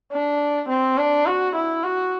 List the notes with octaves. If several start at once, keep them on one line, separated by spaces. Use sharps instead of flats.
D4
C4
D4
F#4
E4
F#4